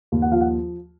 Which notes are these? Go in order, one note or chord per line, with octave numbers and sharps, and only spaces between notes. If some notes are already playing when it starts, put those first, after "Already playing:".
D#2
F#5
F3 F5
F#5